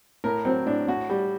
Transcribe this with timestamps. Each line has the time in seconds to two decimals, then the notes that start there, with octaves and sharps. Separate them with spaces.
0.24 A2 A#4
0.45 F#3 C4
0.66 A2 D4
0.87 A2 F#4
1.09 G3